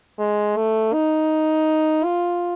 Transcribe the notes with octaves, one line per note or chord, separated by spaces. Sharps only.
G#3
A3
D#4
F4